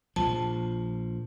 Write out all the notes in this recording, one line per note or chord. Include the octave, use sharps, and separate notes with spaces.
A#1 F3 A5